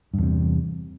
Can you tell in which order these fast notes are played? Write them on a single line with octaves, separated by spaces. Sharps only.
G2 E2 C3